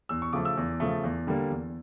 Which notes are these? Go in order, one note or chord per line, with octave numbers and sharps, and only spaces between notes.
E2 E6
C#6
C#3 F3 A3 D6
E6
E2
C#3 F3 A3
E2
D3 G3 A#3
E2